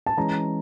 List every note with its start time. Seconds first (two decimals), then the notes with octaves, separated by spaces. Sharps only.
0.06 A5
0.18 E3 G#3 C#4 A#5